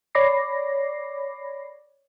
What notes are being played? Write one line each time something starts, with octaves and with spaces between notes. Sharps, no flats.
C#5 D5 B5 D6 A#6 C7